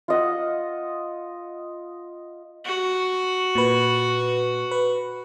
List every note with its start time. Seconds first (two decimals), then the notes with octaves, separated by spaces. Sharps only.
0.08 F4 D#5 F#5
2.65 F#4
3.55 A#2 B4
4.71 B4